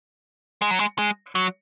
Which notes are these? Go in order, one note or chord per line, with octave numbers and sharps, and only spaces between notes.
G#3
F#3
G#3
G#3
F#3